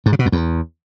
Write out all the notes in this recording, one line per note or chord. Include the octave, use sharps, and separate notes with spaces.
G#2
C#3
B2
F2
E2